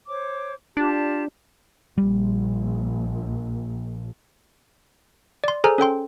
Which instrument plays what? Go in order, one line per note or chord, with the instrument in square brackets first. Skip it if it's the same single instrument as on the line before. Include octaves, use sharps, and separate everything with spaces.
[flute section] C5 C#5 D6
[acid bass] D4 [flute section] F4 G4 A5
[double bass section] A#1 [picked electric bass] G3
[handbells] D5 C6
G#4 A4 C5 G#5 A#5 F6
C#4 A4 G5 C6